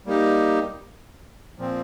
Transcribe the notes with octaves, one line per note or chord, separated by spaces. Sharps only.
G3 A#3 D#4 G4
A#2 F3 C4